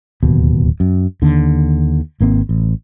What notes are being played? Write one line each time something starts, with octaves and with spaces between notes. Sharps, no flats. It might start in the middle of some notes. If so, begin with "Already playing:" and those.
D1 D#2 B2
F#2
D#2 D3
G#1 A#3 C4
A1